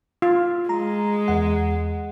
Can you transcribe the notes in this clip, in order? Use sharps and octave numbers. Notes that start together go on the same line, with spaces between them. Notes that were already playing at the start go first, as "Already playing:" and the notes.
F4
G#3 A#5
E2 F#5